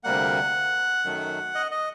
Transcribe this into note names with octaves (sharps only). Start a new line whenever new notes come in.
D2 C3 G3 A#3 F#5
F#2 D#3 F#3 A3
D#5
D#5